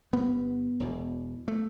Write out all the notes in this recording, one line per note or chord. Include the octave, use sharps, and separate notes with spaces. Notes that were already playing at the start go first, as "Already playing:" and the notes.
G1 G2 B3
E1 E2 B2
A3